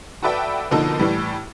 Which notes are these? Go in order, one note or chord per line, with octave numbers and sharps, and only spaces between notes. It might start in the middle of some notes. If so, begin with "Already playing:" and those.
F#4 A4 B4 D5 E5 G5
B2 D3 F3 A#3 D#4 A4
A2 E3 G3